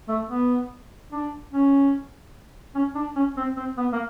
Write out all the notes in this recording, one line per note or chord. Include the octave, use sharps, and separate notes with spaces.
A3
B3
D4
C#4
C#4
D4
C#4
C4
C4
B3
A#3